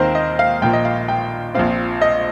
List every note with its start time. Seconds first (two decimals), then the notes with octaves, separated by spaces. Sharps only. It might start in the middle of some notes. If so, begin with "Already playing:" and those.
Already playing: D#2 D#3 C4 A#4 C5 D#5
0.15 D#5
0.39 F5
0.61 A#1 A#2 A#3 G5
0.73 D#5
0.85 F5
1.08 G5
1.55 A#1 A#2 F3 C4 F5
2.01 D#5